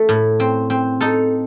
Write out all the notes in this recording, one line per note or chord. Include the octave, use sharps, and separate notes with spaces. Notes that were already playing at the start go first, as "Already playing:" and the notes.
Already playing: A3 A4
A2
C4
C4
D#4 A4